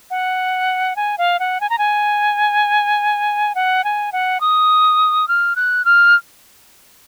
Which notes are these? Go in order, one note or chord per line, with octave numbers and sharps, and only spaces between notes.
F#5
G#5
F5
F#5
G#5
A#5
G#5
F#5
G#5
F#5
D#6
F6
F#6
F6